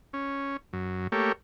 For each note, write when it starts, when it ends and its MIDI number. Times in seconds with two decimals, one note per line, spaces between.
0.13 0.57 61
0.73 1.08 42
1.12 1.32 57
1.12 1.32 58
1.12 1.32 67
1.12 1.32 73